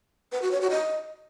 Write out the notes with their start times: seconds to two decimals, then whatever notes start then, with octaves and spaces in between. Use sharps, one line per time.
0.32 B4
0.42 F#4
0.51 C#5
0.61 F#4
0.71 D#5